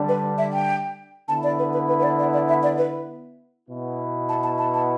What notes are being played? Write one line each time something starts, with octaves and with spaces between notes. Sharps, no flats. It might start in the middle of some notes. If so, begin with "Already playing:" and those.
Already playing: D3 G3 D4
B4
E5
G5
D3 B3 E4 A5
D5
B4
B4
B4
B4
D5
D5
D5
E5
D5
B4
B2 B3 E4
A5
A5
A5
A5